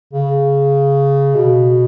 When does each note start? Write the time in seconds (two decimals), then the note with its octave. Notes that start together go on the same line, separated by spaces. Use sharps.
0.13 C#3
1.35 B2